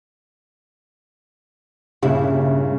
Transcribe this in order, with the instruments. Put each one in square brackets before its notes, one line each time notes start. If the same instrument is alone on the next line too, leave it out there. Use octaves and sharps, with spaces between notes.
[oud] G2 E4 [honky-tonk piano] A#2 C#3